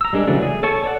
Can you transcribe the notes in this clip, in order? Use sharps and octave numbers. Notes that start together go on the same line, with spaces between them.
A#5 E6
G3 G#3 D4 A#4
C#3 E3 F#3 A3 D4
G#4
A4 C#5 A5 C#6
C#5 D5 F#5